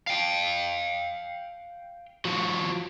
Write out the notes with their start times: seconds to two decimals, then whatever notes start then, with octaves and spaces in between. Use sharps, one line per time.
0.07 F5 G5
2.25 F3 F#4